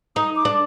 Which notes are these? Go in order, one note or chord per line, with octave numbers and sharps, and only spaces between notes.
D#4 D#6
D6
D4